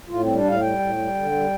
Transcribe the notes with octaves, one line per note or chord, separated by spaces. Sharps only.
A2 F4
G3 C4
D4
A2 F5
G3 G5
A2
G3
D3
G3